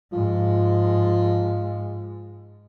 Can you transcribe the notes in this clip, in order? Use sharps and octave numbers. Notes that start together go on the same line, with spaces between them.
G#2 F3